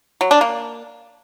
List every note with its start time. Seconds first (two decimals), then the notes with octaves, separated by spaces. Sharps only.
0.21 F#3
0.31 D4
0.41 A#3